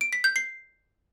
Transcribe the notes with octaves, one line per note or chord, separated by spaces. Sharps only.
D7
B6
G6
C7